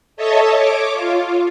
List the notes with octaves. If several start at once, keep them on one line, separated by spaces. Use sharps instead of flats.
A4 C#5 D#5 E5 A5
C#5 D6
F4